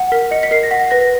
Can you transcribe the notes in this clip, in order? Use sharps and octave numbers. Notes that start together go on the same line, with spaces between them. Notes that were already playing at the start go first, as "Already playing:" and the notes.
Already playing: F#5
A#4 B6
D#5 C#7
B6
A#4 C7
A#6
F#5 B6
B4 A#6